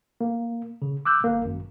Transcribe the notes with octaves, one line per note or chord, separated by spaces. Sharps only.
A#3
C#3
D6 E6 F#6 G6
G1 A#3
G#1 F#2